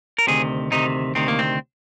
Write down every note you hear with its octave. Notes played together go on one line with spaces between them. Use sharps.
A#4
D2 C3 D#3 G#4
D2 C3 D#3 D#4
D2 C3 D#3 C4
A#3
C4